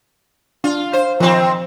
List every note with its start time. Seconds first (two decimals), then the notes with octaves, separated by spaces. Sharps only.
0.64 D4 F4
0.93 C5
1.20 D#3 F3 C4